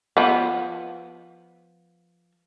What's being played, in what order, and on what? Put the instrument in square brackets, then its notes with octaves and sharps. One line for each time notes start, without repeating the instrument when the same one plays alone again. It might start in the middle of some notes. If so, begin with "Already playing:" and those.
[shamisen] F3 B3